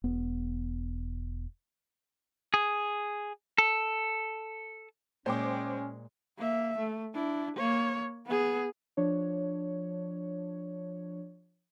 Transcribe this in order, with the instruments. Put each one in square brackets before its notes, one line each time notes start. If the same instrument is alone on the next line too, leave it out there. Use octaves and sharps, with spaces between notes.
[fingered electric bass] E1 B3
[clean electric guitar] G#4
A4
[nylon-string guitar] A#2 C#5 [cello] G#3 [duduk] C#4 [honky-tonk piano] C5 G5 D6
[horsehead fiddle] A#3 E5
A3
D4 E4
A#3 C#5
B3 G#4
[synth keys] F3 D4 C#5